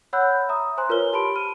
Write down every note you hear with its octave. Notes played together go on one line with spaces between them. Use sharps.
C#5 F#5 B5 E6 F#6 G6
E5 A#5 D#6
C5 G#5 A#5 C6 F#6
F4 A#4 B4 C#5 F6 G7
G4 A5 B5 C6 D7
F6 D#7